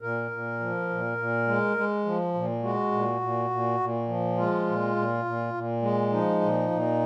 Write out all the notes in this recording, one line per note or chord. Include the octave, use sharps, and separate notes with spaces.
A#2 A#4
A#2
F3
A#2
A#2
G#3
G#3
F3
A#2
G#3 F#4
A#2
A#2
A#2
A#2
F3
G#3 F4
A#2
A#2
A#2
A#2
G#3
F3 D#4
A#2
A#2